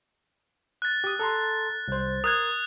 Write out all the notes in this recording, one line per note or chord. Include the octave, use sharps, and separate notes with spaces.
F#6 A6
G4 D#6
A4 A#5 C6
C2 C5
A#4 D#6 F#6 G#6